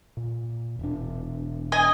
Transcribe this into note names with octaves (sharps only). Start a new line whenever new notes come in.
A#2
E1 D4
D#5 G#5